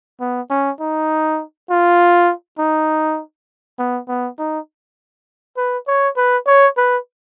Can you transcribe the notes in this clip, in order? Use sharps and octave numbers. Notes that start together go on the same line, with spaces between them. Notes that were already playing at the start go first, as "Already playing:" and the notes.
B3
C#4
D#4
F4
D#4
B3
B3
D#4
B4
C#5
B4
C#5
B4